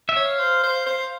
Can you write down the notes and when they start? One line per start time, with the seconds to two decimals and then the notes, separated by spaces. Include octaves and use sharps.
0.09 E5
0.16 C#5
0.25 F5
0.39 C5
0.63 C5
0.86 C5